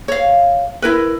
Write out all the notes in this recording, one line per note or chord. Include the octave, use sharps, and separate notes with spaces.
C#5 F5
E4 A#4 B4